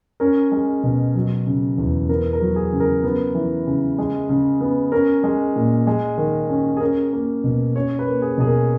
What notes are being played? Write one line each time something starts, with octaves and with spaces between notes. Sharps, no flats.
C#4 A#4
G#3
B2
F#3
C#3
E2
B3 A#4
A#4
F#3
G#4
C#3
A#4
B3
E3
C#3
G#3
C#3
B3
C#4 A#4
G#3
A#2
G#3
D#3
C#4
G#4
C#4 A#4
A#3
B2
C#4 C#5
B4
A#3
G#4
B2 G#4
A#4